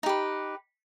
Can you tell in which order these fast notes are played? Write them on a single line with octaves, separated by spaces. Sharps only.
D#4 G4 B4